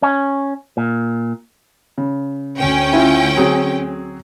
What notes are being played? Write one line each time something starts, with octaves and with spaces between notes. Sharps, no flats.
C#4
A#2
C#3
D2 C#4 G5
E4 F4
F#3 C4 G#4